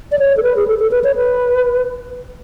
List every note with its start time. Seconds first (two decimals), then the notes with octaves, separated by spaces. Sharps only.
0.12 D5
0.19 C#5
0.37 A4
0.43 B4
0.57 G#4
0.67 A4
0.79 A4
0.91 B4
1.04 C#5
1.15 B4